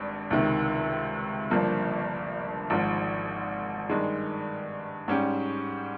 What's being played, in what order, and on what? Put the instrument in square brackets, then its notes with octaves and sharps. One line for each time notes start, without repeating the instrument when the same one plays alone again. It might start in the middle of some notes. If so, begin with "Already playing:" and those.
Already playing: [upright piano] G#1 G2
C#2 C3 D#3
G1 G2 F3 A#3
G#1 G#2 F3
G2 D#3 G#3
G#2 G3 C#4 G4